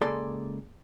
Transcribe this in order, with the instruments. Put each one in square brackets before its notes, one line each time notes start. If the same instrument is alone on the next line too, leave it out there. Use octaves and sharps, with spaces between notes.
[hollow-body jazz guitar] C#2 A#3 G#4 A4 D5 C6